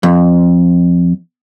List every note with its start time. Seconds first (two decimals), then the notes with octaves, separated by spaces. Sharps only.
0.03 F2